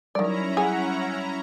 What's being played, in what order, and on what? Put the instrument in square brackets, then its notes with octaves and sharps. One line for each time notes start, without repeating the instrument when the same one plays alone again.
[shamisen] D#3 D5 [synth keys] F#3 G3 [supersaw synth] C#4 E4 A#5
[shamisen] G#4 [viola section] C#5 E5 F#5